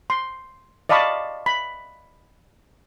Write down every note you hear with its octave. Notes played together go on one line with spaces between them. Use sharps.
C6
D5 D#5 F5 A5 B5 C#6
B5